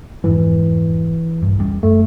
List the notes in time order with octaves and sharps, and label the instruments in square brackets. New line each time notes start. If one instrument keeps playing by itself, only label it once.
[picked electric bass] E1 F2 G#2 [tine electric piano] E3
[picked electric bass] A#1 G2
E2 G3 C#4
[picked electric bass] F#2 [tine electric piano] A3